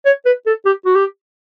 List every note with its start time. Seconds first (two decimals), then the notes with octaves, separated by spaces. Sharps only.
0.06 C#5
0.26 B4
0.46 A4
0.65 G4
0.86 F#4
0.95 G4